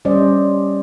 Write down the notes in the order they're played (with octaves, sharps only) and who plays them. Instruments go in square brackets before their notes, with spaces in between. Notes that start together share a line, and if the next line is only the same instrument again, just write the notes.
[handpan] G3 C#4 C5 D5 D#5